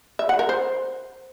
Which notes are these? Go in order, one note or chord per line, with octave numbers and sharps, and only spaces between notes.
E5
F#5
A#4
C5